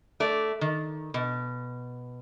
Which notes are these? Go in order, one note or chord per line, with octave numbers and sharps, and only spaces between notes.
A3 D5
D#3
B2